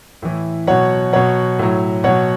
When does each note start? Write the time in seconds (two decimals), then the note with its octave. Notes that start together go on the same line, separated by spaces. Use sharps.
0.22 A2 E3
0.67 B2 F#3 C#5 F#5
1.13 B2 F#3 C#5 F#5
1.59 A2 F#3
2.04 B2 F#3 C#5 F#5